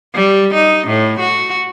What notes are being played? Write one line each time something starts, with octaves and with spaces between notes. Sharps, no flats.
G3
D#4
A2
F#4